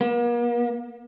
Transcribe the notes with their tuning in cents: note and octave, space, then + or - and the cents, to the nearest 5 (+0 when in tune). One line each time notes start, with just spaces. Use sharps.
A#3 +40